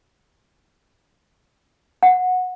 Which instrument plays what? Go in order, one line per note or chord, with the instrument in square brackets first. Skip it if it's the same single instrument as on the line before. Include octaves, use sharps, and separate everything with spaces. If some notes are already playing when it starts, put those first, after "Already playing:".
[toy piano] F#5